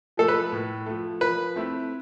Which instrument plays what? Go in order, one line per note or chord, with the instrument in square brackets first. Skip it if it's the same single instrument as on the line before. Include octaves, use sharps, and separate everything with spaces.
[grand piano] F3 A3 [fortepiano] A4
[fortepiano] B4
[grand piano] A2
F3 A3
[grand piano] F3 [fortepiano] B4
[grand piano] A3 C4 E4